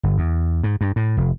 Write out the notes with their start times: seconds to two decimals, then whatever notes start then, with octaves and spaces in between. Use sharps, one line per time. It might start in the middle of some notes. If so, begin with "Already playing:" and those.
0.03 G1
0.18 E2
0.63 G#2
0.81 G2
0.96 A2
1.17 F1